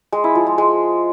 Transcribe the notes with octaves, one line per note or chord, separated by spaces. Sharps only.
G#3
E4
F3
G#3
G#3